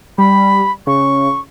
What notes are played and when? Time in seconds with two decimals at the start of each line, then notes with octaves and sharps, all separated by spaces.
0.18 G3 B5
0.87 C#3 C#6